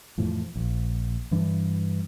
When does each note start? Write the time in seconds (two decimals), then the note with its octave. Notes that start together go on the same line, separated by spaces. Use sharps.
0.18 F2 A2 E3 F3
0.56 A#1
1.31 G2 E3 D4